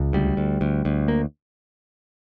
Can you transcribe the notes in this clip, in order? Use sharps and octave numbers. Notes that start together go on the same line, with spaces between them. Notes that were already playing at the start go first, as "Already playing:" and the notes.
Already playing: C#2
D2 G3
D2
D2
D2
A#3